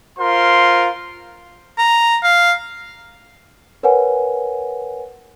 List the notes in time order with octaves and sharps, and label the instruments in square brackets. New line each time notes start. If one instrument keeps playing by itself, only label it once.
[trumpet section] F4 A#4 C5 C6
[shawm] A#5
F5
[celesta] A#4 B4 C#5 F#5 G#5